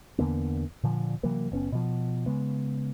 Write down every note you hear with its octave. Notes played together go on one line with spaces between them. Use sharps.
E2 D3 A#3 B3
A#2 D3 F3
C3 E3 F#3 A#3
F#1 B3 C#4
B2 F3
C#3 G#3 B3